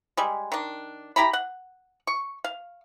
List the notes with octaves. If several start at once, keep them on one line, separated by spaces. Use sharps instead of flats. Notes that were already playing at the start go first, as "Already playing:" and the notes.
G3 G#3
D#3 D4
E4 G4 A#5 B5
F#5
C#6
F5